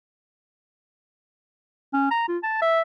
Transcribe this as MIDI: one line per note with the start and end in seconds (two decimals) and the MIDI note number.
1.94 2.08 61
2.11 2.25 82
2.28 2.38 65
2.43 2.57 81
2.61 2.82 76